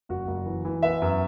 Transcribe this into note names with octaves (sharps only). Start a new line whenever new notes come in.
F#1 F#4
F#1
E3
E3
B3 E5
F#2